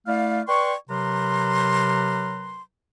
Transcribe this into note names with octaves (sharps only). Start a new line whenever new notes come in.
A3 E4 D5 F5
B4 D5 G5 C6 C#6
C3 F#3 A#4 B4 A#5 C6